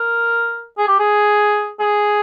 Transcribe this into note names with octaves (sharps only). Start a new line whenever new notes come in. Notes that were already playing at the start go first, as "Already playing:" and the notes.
Already playing: A#4
G#4
G4
G#4
G#4